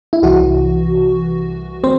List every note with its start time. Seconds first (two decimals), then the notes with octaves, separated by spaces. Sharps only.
0.13 E4
0.23 C2 C3 E3 F#4
1.84 C4 C5